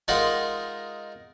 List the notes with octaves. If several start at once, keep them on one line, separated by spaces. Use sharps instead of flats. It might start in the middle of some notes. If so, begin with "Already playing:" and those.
G#3 D#4 F4 A#4 D#5 F#5